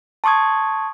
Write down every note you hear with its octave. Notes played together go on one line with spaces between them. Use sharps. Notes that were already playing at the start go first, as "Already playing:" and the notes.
A5 C6 C#6 D#6 G#6